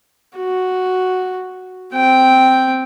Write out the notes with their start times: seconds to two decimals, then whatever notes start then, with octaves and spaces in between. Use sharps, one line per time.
0.37 F#4
1.94 C4 G5